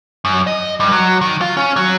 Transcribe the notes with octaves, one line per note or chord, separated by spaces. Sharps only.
F#2
D#5
G2
F#3
D#3
F4
C#4
F#3